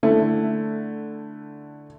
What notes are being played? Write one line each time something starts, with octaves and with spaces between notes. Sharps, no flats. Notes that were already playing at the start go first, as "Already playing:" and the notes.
D3 A3 E4